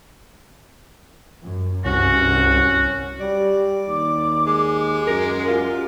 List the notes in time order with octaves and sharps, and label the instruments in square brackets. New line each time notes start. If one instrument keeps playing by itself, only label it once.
[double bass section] F#2
[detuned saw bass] C2 [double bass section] G2 [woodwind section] C#4 F#4
[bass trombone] G3 [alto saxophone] D5
[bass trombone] D#2 [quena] D6
[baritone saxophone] G#3
[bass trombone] F#2 [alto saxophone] A#4
[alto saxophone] F4 [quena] G4